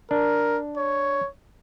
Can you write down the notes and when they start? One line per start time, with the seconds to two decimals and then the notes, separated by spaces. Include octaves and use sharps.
0.11 D4 A#4
0.77 C#5